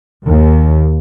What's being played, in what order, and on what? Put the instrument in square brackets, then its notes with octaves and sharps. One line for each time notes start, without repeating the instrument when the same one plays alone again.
[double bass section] D#2